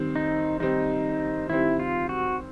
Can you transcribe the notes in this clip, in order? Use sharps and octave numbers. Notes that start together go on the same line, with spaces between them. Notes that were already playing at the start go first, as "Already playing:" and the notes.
Already playing: D#3 G3 C4
D#4
D#3 G3 C4 D#4
D#3 G3 C4 E4
F4
F#4